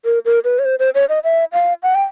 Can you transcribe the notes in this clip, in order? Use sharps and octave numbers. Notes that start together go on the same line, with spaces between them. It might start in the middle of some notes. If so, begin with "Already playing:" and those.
A#4
A#4
B4
C#5
C5
C5
C#5
D#5
E5
F5
F#5
G5